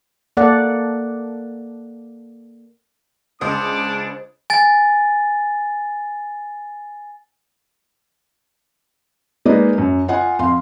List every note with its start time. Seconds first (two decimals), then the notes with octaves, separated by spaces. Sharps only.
0.37 A#3 A4 D5 F#5
3.41 C#2 D4 C5 D#5 D6 D#6
4.50 G#5 A6
9.45 G#3 A#3 D#4 B4 D5 D#5
9.78 F#2
10.08 F4 D#5 F#5 G#5
10.39 F2 F5 C6